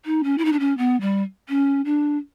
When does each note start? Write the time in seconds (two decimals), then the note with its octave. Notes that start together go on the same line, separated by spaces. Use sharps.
0.05 D#4
0.24 C#4
0.38 E4
0.45 D#4
0.52 D4
0.59 C#4
0.78 B3
1.01 G3
1.49 C#4
1.85 D4